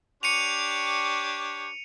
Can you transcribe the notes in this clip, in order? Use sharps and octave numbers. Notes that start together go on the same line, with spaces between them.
D4 G4 C#5 C#7 D#7 F7